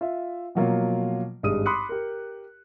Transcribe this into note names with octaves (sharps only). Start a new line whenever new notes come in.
F4 E5
B2 F3 F#3 A#3 F4
G#1 G2 G#3 D#6 D#7
B5 C6 D6 D#6 F#6 C#7
G4 A#4